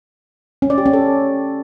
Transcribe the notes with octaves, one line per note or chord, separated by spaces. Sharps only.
C#4
D5
G4
C#4
A4